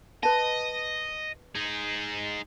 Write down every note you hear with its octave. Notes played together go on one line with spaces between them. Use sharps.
B4 D#5 A5
D#4 G#4